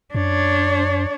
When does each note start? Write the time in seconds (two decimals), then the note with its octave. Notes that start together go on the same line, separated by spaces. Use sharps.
0.15 F#2 D4 C#5